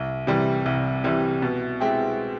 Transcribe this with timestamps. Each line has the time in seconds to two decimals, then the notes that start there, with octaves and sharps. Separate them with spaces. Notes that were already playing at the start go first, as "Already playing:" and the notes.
Already playing: C2
0.27 C3 E3 G3
0.66 C2
1.04 C3 E3 G3
1.42 B2
1.80 G#3 C4 E4 G4